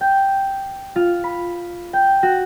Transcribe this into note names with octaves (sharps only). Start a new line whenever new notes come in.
G5
F4
B5
G5
F#4